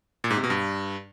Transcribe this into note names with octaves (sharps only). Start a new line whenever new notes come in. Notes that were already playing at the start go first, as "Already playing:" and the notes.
A#2
G#2
C3
B2
G2